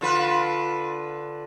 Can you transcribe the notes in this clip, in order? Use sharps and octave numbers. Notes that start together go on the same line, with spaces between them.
D3 F4 B4